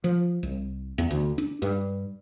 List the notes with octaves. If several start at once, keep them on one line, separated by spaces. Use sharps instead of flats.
F3
C2
E2
D2
D4
G2